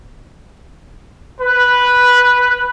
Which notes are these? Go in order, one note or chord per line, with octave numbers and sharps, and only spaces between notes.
B4